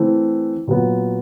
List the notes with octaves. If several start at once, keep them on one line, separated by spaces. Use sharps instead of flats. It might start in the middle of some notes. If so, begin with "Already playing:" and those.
Already playing: E3 A3 C4
A#2 F#3 B3